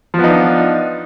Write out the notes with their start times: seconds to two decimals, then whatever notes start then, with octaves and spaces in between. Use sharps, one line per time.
0.14 F3
0.19 B3
0.24 D#4
0.29 D4